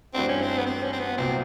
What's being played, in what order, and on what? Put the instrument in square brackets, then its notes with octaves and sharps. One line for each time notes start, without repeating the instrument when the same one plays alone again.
[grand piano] G2 E3 A3 D4 F#4 [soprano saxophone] C4
[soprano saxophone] C#4
C4
B3
C4
C#4
C4
B3
[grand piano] C2 A#2 F#3 [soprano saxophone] C4